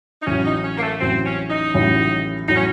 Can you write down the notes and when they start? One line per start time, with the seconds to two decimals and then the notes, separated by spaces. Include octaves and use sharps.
0.22 D#4
0.27 A1 A2 F#3 C#4
0.45 D#4
0.64 C#4
0.78 A#3
0.82 A3
1.00 A1 A2 F#3 C4
1.26 C#4
1.50 D#4
1.74 A1 A2 F#3
2.48 A2 F#3 D#4
2.56 C#4